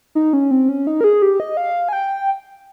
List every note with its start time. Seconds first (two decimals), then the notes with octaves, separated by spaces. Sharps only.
0.15 D#4
0.33 C#4
0.51 C4
0.69 C#4
0.87 D#4
1.01 A#4
1.04 G#4
1.22 G4
1.40 D#5
1.57 F5
1.89 G#5
1.93 G5